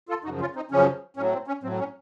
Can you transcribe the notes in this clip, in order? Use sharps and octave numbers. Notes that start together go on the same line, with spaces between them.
F4 A4
F#2 C#3 F3 D#4 F#4
C#4 F4
C4 D#4
F#2 C#3 F3 C#4
A2 F#3 C#4
C4
C#4
A2 F#3 C4
C#4